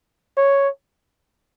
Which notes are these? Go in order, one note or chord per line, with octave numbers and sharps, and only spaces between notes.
C#5